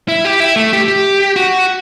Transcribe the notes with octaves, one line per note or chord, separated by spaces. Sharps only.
E4
G4
E4
A3
G4
G4
F#4